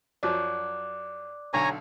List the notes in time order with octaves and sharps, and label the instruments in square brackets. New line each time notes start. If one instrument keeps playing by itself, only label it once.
[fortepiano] F#2 F3 F#3 [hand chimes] D5 D6 F#6
[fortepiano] B1 D3 [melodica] C#5 G#5 A#5